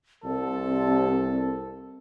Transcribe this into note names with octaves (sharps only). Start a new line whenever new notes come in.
C2 C4 A4